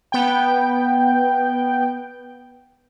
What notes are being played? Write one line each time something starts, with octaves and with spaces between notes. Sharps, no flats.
B3 G5